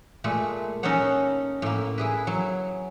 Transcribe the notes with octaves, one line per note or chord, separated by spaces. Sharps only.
A#2 G#3 A3
C#4 D#4 A4 C#5 F#5
A2 A#3
E4 G#4 B4
F#3